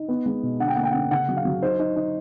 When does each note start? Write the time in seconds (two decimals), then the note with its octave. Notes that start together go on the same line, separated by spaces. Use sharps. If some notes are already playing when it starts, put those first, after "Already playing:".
Already playing: D#4
0.08 B3
0.26 G#3
0.43 B2
0.60 D3 F#5
0.68 G5
0.76 A#3 F#5
0.83 G5
0.91 C#4 F#5
1.11 C#3 F#5
1.29 F#3
1.37 F5
1.45 F#3
1.62 D#4 C5
1.79 D#4
1.96 D#4